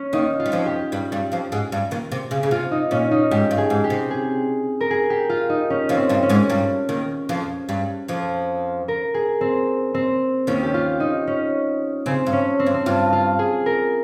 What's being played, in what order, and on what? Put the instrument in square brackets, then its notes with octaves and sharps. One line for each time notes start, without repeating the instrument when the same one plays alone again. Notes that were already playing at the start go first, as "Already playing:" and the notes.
Already playing: [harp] C#4
[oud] D#2 D#3 [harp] D#4
[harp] F4
[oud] G3
F2 F3
[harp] G4
[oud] G2 G3
G2 G3
F2 F3
G#2 G#3
G2 G3
D#2 D#3
C3
C#3
C#3
[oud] C3 [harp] F4
[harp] D#4
[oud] A#2 [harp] C#4
[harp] D#4
[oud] G#2 [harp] G4
[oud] G2
[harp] G#4
[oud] G#2
[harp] G4
[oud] C3
[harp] G#4
A#4
G#4
G4
F4
D#4
C#4
[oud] F2 F3
[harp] C4
[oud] G2 G3
[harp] C#4
[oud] G#2 G#3
G2 G3
D#2 D#3
F2 F3
G2 G3
F2 F3
[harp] A#4
G#4
C4
C4
[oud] D#2 D#3 [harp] C#4
[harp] G4
F4
D#4
C#4
[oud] C#3 [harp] C4
[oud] G2
[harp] C#4
C4
[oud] G2
[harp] C4
[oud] G2 [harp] F4
[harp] F4
G#4
A#4